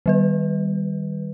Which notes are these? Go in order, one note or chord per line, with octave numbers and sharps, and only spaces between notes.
D#3 G3 B4